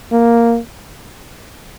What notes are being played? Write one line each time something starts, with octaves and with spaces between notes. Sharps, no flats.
A#3